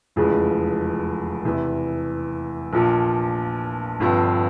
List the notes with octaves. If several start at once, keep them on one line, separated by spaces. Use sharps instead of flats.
F1 E2 C#3 F3 G#3
E2 C3 E3
A#1 A#2 F3
G1 G2 F3 C4